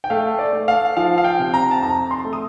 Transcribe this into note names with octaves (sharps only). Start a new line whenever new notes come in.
G5
A3 F5
D5
A3
F5
F3 F5
F5
G5
C3
A#5
A5
F2 A#5
C6
A3
D#6